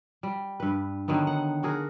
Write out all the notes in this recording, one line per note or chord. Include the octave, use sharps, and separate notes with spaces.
G3
G2 B4
D3 D#3 F#3 B3
F#5
D4 F#4 G#4 A#4